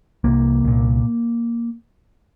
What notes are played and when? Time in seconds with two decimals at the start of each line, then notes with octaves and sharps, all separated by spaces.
0.24 C2 C3 A#3
0.64 C2 A#2